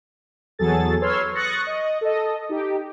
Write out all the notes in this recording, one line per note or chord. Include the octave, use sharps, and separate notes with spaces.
E2 F#3 G#4 A4 A6
B4 C#5 C6 E6 F6 G#6
C#6 D#6 F#6 A6 A#6 C#7
D#5
A4 D#5
D#4 G4